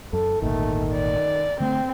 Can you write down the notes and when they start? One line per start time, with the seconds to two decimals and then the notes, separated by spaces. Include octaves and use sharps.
0.13 F#2 A4
0.42 G#1 D2 A#2 D#3 A3
0.92 D5
1.60 D3 A3 C4